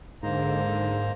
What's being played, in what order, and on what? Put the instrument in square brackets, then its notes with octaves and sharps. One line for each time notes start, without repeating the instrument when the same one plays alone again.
[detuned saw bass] G#2 [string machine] D3 [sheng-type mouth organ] A#3 C5 A#5